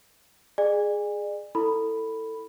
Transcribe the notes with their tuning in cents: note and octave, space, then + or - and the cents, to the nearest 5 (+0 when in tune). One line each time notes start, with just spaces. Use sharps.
G#4 +0 D5 +35 G#5 -30
E4 +0 A4 +20 B5 +0